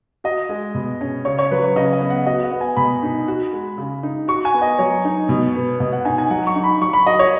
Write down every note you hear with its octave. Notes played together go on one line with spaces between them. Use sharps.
F#4 D#5
G#3
B2
C#4
C#3 C#5
C#5
F#3 B4
C#5
C#3 D#5
D#5
B3
F#5
F#4 D#5
F#5
B3
G#5
B2 B5
D#4
F#4
G#3
C#3
D#4
F#4 C#6
G#5
B3
D#5
F#3 C#5
D#4
B2
B3
B2 D#5
F#5
D#4 G#5
G#5
F#3 F#5
C#6
D#4
B5
F#3 C#6
B5
F#4 D#5
C#5